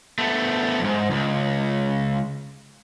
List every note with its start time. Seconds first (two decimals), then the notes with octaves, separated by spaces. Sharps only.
0.18 A3 B3
0.80 F2 G#2
1.10 C#2